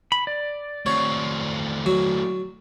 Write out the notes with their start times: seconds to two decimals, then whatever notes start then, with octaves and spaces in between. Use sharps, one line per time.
0.12 B5
0.27 D5
0.86 A2 C4 C#5
1.86 F#3